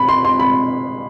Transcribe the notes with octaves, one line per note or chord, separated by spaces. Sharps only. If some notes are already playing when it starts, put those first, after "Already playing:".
Already playing: B5
C6
C6
B5